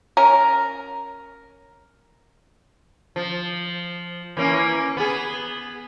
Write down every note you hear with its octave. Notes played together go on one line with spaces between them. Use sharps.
C#4 A#4
F3
E3 A#3 C#4
B3 G#4